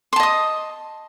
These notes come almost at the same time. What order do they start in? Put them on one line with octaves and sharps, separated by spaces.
C6 A5 D#5 D#6